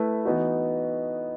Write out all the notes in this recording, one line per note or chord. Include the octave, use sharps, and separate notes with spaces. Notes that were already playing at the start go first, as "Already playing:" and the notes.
Already playing: A3 E4 B4
E3 B3 D#4 F#4